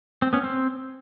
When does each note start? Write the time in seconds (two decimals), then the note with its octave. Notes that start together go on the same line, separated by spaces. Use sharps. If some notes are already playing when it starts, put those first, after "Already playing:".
0.22 C4
0.33 B3 C#4
0.44 C4